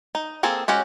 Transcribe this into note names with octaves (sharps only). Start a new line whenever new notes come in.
D#4
A#3 C4 G#4 A4
G#3 C#4 F#4 G4